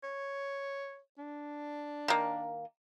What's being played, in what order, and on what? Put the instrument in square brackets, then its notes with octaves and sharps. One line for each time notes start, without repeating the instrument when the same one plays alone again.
[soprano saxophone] C#5
D4
[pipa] D#3 A#3